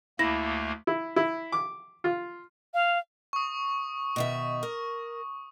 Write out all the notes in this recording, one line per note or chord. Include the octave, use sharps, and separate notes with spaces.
D2 A3 A#3 E4 A#6
E4
E4
D6
F4
F5
C#6 D#6
B2 D#3 E5
A#4